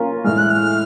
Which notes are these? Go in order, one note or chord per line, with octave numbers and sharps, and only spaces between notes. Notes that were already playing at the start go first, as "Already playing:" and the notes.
Already playing: A#3 C#4 F4 A#4
A2 E3 G#3 F6
F#6
F6